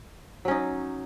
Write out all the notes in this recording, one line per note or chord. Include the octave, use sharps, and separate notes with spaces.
F#3 C#4 D#4